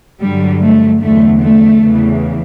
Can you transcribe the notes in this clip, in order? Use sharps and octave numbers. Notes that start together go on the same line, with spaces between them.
G2 D3 F#3 G3
A3
E2 D3 F#3 A3
A3
E2 C#3 E3